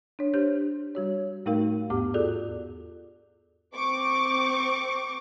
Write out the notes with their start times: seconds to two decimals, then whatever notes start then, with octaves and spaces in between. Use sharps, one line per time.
0.19 D4 C#5
0.34 D4 G4 C5 G6
0.95 G3 F#4 C#5
1.46 A2 A3 D#4 F#4 A#4 F5
1.90 E2 G#2 B3 G4 D6
2.14 F4 F#4 G#4 A4 D5
3.75 C4 C#6 D6